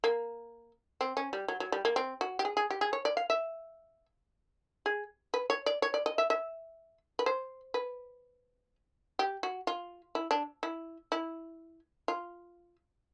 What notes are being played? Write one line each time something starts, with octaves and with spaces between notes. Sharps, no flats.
A#3
C4
C#4
G3
F#3
F#3
G3
A#3
C4
F#4
G4
G#4
G#4
G4
G#4
C#5
D5
F5
E5
G#4
B4
C#5
D5
C#5
D5
D#5
E5
E5
B4
C5
B4
G4
F#4
F4
E4
D4
E4
E4
F4